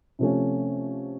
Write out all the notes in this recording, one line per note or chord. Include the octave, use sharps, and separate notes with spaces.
C3 F3 A3 C#4